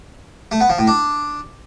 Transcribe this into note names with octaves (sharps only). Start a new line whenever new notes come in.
A3
B3
F3
A2
D4